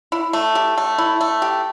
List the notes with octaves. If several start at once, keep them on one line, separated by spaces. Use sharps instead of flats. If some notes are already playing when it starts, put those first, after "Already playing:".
E4
A3
G4
A3
E4
A3
G4